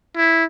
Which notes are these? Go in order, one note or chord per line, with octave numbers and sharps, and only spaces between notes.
E4